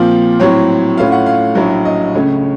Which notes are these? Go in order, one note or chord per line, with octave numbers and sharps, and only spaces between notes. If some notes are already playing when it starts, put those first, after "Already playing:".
Already playing: A#2 F3 C4 F4 F5
A2 F#3 C4 C#5
A2 A3 C#4 F4 F5
F#5
F5
A#1 A2 F#3
D#5
C#2 C#3 A3 C#4 C#5